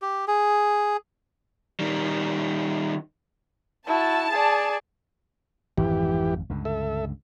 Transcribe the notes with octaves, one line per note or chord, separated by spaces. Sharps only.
G4
G#4
D#3 G3
E4 F#4 A5
G#4 D5
G#1 F2 G#2 E3 G4
C#2 G2 D3
A4 E5